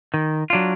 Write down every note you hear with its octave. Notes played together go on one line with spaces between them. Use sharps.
D#3
F#3 D4 F4